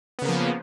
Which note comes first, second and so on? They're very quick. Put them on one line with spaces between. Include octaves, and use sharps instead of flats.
B3 C#3 A#3 F3